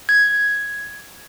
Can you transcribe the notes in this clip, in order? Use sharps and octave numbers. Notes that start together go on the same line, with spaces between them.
G#6